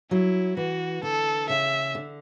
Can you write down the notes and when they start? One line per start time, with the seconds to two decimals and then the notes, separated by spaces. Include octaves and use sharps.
0.10 F#3 E4
0.57 E3 F#4
1.03 D3 A4
1.49 C#3 E5
1.95 D3